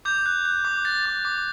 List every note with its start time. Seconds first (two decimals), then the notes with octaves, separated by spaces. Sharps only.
0.05 D6 G6
0.26 F#6
0.45 F#6
0.65 D6
0.85 F#6 A6
1.05 D6
1.25 D6